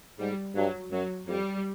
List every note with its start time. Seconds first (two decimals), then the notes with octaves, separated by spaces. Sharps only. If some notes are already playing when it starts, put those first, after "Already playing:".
0.20 G#2 G3
0.56 G2 F#3
0.91 F#2 F#3
1.27 F2 G3